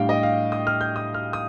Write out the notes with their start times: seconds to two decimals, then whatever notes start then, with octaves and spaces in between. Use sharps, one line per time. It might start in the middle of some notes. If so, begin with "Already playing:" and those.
Already playing: A2 G3 D4 F5 G5
0.09 D#5
0.23 F5
0.52 D#6
0.67 F6
0.81 G6
0.96 D#6
1.14 F6
1.33 D#6